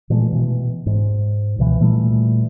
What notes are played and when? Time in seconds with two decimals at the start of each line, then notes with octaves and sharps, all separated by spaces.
0.10 A#2 E3 G#3 A3
0.33 B2 E3
0.86 G#2
1.59 C#2 B2 E3
1.80 A#2 E3 G3 A3